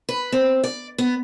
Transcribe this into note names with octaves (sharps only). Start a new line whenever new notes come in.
B4
C4
D5
B3